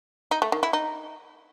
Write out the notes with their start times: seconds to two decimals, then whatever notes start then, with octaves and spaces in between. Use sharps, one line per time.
0.31 D#4
0.42 A3
0.52 D#3
0.63 E4
0.73 D#4